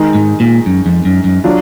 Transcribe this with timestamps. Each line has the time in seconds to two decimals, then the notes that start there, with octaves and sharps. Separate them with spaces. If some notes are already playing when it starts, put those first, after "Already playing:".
Already playing: D#3 G#3 D#4
0.15 G#2
0.40 A#2
0.66 F#2
0.86 F2
1.05 F#2
1.24 F#2
1.44 F#3 D4 F4